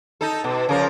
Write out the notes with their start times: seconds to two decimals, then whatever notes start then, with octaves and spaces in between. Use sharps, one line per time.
0.21 D#4 A4
0.44 B2
0.69 C#3 F3 A#4